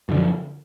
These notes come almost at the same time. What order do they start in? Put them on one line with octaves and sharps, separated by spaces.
F#2 D3 F3